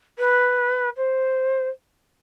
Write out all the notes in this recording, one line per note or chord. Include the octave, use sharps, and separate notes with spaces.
B4
C5